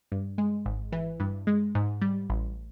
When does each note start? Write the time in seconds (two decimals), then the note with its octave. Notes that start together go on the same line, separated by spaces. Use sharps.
0.12 G2
0.38 G#3
0.66 G#1
0.92 E3
1.20 G2
1.47 G#3
1.75 G#2
2.02 G3
2.29 A1